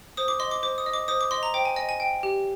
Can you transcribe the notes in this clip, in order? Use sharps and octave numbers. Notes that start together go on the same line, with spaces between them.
C5 D#6
D6
D#5 C6
D6
C5 D6
D#6
D#5
D6
C5 D#6
D6
D#5 C6
A#5
C5 G5
G#5
D#5 G#5
G#5
G5
G4